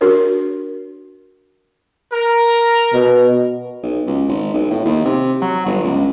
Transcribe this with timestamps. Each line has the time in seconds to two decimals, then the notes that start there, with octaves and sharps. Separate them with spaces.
0.01 D4 F#4 G#4 A#4 C#5
2.11 A#4
2.94 B2
3.83 B1
4.06 C#2
4.28 G#1
4.54 B1
4.71 A2
4.86 D#2
5.05 C3
5.42 F#3
5.66 G1
5.84 C#2